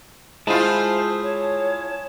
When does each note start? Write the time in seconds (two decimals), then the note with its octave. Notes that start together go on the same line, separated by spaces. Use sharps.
0.47 G#3 E4 F4 G#4 C5 A5
1.23 C#5